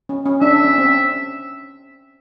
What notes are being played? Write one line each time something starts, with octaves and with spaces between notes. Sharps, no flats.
C#4
C#4
D4 E5
D4
C#4
C4